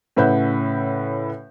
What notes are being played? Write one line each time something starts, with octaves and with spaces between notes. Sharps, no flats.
A2 C#3 B4 E5 F#5 G6